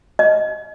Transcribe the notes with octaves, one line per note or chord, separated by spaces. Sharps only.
D#5